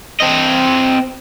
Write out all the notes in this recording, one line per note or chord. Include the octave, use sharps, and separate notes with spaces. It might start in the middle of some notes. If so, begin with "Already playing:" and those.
C4 D#5